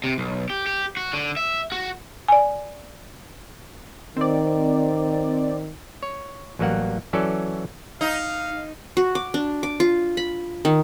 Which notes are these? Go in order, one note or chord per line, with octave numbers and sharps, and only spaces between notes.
C3
B1
G4
G4
F#4
D3
E5
F#4
D5 G#5
D#3 C4 D5
C#5
A1 F#3 G3 A#3 F#5
E3 F#3 C#4 A4 D5
D#4 F5
F#4
D6
D4
D6
F4
B5
D#3